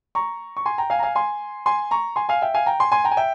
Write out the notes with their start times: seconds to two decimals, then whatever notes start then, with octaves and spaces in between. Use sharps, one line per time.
0.15 A#5 C#6
0.57 C#6
0.66 G#5 C6
0.78 G5 A#5
0.90 F5 G#5
0.99 A#5
1.03 F5 G#5
1.15 G#5 C6
1.66 G#5 C6
1.91 A#5 C#6
2.16 G#5 C6
2.29 F5 G#5
2.42 E5 G5
2.54 F5 G#5
2.66 G5 A#5
2.80 G#5 C6
2.92 G#5 C6
3.04 G5 A#5
3.11 G#5
3.17 E5 G5